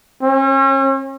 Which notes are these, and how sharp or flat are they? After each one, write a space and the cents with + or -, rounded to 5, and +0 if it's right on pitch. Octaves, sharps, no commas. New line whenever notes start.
C#4 -40